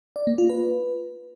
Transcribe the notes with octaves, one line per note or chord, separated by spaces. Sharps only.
D5
A#3
F4
B4